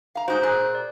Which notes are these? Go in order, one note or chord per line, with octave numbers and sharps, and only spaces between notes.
F5 A#5
G#3 D#4 F#4 C5 G6
A#2 G#4 F#6
D5